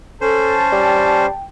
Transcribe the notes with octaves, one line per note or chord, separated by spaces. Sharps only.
C#4 A4 C5 A5
G3 G5